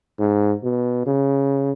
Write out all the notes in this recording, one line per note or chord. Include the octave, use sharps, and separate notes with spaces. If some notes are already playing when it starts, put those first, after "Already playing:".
G#2
B2
C#3